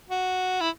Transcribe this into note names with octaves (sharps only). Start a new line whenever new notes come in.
F#4
E4